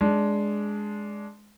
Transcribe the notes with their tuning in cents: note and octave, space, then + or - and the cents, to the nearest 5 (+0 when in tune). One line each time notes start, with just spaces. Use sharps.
G#3 +5 D4 -15